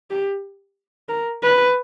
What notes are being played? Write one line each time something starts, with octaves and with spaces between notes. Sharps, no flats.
G4
A#4
B4